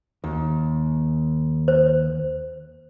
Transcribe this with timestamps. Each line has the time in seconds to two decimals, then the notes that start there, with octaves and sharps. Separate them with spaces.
0.24 D#2
1.68 C5